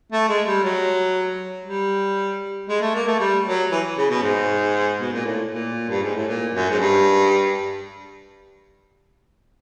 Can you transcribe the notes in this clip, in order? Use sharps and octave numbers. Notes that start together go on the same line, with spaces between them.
A3
G#3
G3
F#3
G3
G#3
A3
A#3
A3
G3
F#3
E3
C#3
B2
G#2
B2
A#2
A2
A#2
G2
G#2
A2
A#2
F#2
G#2
G2